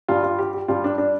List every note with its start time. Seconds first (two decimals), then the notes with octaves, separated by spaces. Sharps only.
0.08 G2 G3 F4
0.23 F4
0.39 G4
0.54 G4
0.68 G2 G3 F4
0.84 D4
0.98 D4